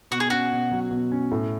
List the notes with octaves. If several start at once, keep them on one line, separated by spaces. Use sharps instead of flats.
B2 F#4
G#4
C#4 F#4
B2
F#3
B2
C#4
A2